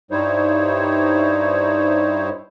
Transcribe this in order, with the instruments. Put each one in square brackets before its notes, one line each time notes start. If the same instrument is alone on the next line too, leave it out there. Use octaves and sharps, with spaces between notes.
[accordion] G2 G3 D#4 E4 C5 C#5